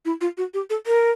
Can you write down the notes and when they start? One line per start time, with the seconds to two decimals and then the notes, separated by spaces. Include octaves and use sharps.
0.05 E4
0.21 F4
0.38 F#4
0.54 G4
0.70 A4
0.87 A#4